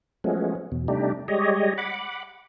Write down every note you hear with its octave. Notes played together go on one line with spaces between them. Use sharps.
F3 F#3 G#3 A3 B3 C#4
E2 B2
C3 G3 A3 D4 D#4 G4
G3 G#3 G4 C#5 D#5
F#5 B5 D6